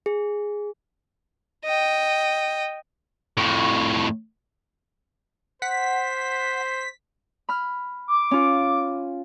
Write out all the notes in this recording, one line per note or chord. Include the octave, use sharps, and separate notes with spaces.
G#4
D#5 G5
F2 A2
C5 F#5 B6
B5 F6
D6
C#4 F4